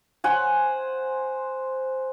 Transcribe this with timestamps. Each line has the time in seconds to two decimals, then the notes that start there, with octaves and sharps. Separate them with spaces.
0.24 C5 F#5 G#5